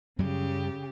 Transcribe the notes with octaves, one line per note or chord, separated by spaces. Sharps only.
F#2 C#3 F#3 G3 G4